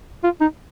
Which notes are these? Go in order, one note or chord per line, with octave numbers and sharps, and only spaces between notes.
F4
D#4